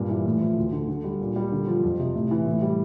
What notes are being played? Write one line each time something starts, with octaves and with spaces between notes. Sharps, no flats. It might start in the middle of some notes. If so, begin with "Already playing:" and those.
Already playing: G2 A#2
E3
A2
F3
D2
D3
D3
G3
A#2
G3
D3
F3
F2
C3
A2
E3
A2
G3